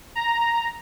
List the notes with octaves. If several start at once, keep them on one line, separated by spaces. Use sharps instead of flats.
A#5